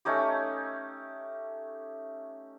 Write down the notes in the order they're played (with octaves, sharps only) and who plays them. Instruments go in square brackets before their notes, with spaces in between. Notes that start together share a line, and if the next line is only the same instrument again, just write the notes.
[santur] A3 C#4 D#4 G4